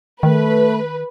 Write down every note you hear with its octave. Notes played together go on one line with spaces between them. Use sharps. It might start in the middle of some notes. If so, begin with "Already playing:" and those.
D#3 A3 B4